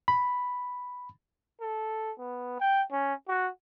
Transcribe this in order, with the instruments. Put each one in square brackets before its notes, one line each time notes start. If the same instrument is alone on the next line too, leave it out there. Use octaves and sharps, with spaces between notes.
[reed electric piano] B5
[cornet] A4
B3
G5
C#4
F#4